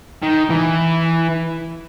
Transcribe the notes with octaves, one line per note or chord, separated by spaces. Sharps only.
D#3
E3